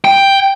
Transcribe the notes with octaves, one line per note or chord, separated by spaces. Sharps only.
G5